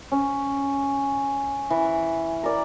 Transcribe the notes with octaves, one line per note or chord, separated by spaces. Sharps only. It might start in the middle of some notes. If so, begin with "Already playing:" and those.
C#4
E3
A#4 D5